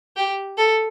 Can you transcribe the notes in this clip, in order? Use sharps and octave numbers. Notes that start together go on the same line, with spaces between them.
G4
A4